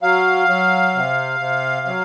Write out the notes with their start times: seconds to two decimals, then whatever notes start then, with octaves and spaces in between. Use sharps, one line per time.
0.02 F#3 F5
0.48 F#3
0.95 C3
1.40 C3
1.86 F#3